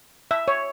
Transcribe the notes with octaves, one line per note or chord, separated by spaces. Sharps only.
E5
C#5